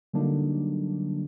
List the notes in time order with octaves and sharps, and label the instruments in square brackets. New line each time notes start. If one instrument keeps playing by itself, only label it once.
[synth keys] D3 F#3 G3 A#3 D4 D#4